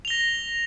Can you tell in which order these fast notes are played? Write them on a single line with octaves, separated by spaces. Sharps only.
F7 G7 A#6